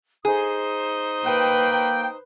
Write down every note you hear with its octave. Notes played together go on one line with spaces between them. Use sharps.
D#4 G#4 C5 D#6
A#3 B4 G5